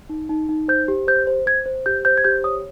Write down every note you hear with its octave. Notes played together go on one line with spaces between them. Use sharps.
D#4
D#4
D#4
C5 G6
G4
C5 G6
C5
C5 G#6
C5
G4 G6
C5 G6
G#6
G4 G6
C#5 D#6